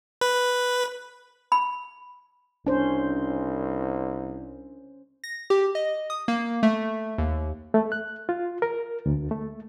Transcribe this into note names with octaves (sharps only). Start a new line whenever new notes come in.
B4
B5
C2 C#4 D4 C5
A#6
G4
D#5
D#6
A#3
A3
D#2
A3
F#6
F4
A#4
D2
A3